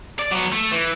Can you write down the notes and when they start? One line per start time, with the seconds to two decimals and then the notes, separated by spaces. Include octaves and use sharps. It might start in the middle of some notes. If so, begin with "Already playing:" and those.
0.19 D5
0.31 F#3 B3
0.52 A3
0.71 E3